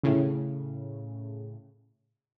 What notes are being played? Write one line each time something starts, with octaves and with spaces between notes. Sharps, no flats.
A2 C#3